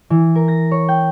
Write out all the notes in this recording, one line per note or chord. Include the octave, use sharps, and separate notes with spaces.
E3
A#4
A#6
C#5
G5